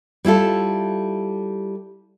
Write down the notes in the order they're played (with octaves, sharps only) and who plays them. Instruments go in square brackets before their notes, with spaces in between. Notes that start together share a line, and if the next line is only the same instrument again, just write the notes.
[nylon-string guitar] G3 E4 F4 A4